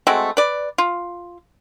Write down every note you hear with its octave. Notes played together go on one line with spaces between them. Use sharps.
G#3 A3 C4 F#4
B4 D5
F4